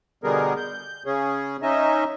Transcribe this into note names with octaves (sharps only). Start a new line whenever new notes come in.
B2 D3 G3 B3 G#4 A#4
G6
C#3 C#4 G#4
C#4 D#4 D#5 E5